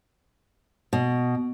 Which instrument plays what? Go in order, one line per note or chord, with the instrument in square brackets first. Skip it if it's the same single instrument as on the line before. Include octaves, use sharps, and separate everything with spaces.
[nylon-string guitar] B2